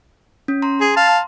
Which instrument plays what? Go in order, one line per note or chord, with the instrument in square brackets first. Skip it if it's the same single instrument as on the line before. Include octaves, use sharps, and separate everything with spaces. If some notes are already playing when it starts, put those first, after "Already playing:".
[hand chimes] C#4
A#5 C6
[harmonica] G#4
F5 A5